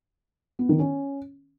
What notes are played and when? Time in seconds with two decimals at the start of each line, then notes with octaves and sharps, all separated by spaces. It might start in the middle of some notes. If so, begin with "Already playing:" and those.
0.59 B3
0.69 D#3
0.79 C#4